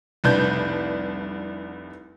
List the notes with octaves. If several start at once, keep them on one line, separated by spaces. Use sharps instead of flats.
F1 C2 D4 B4 G6